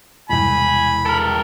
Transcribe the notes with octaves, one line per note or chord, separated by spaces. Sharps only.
E1 C2 G#5 B5
A4 A#4